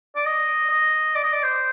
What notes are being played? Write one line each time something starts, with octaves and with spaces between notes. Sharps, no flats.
D5
D#5
D#5
D5
D#5
D5
C5